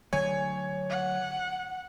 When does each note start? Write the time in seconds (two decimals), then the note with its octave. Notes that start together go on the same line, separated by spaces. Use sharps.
0.13 D3 F#3 A3 C#5 G#5
0.90 F#5